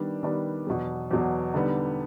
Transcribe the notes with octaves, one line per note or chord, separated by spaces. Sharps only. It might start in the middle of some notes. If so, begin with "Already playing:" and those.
Already playing: D#3 G3 B3 D4
D#3 G3 B3 D4
E2 B2 F#3
E2 B2 F#3
D3 G3 B3 D#4